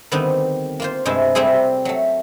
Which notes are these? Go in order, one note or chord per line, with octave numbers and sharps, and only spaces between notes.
D3 D#3 G3 B3 C4 D#4
A#3 F4 C5
G2 C3 G#3 E4 C5 A5
G3 A3 C4 E4 G#4
F#3 A3